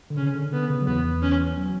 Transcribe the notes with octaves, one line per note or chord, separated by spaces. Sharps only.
D3
C#3 C#4
D3
D3 B3
C#3
F#3
E2 E3 B3
C#4
F#3